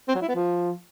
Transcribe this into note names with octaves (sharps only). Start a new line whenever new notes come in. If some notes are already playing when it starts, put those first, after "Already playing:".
C4
F#3
E4
B3
F3